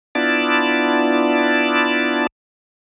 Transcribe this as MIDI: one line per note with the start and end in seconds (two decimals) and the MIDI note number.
0.15 2.27 59
0.15 2.27 62
0.15 2.27 64
0.15 2.27 65
0.15 2.27 74
0.15 2.27 81